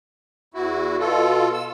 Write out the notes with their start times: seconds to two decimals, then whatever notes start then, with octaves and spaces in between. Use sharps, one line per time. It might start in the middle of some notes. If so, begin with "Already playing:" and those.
0.54 E2 E4 F#4
0.99 B2 F4 A4
1.53 E6